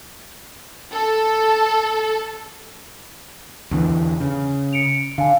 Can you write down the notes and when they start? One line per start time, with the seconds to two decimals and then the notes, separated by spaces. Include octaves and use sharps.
0.92 A4
3.71 E2 D3 E3
4.20 C#3
4.73 C#7 D7 F7
5.18 D3 F5 G#5